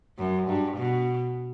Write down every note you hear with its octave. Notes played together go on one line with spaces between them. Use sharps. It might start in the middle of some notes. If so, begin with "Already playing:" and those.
F#2
G2
B2